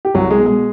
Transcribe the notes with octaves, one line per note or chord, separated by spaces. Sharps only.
G4
C2 F#3 F#4
G#3 G#4
B2
G#3 G#4